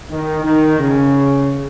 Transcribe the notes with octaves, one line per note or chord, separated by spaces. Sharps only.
D#3
D#3
C#3